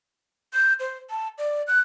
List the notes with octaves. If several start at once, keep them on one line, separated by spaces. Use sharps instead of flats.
G6
C5
A5
D5
F#6